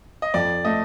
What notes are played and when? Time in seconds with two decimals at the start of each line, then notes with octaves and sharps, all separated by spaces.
0.22 D#5
0.34 F2 D5
0.65 A3 D#5